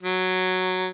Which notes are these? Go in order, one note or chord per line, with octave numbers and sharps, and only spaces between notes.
F#3